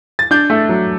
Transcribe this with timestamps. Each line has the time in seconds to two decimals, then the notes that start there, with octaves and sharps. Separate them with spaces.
0.19 A6
0.31 D4 G6
0.50 A3
0.69 F#3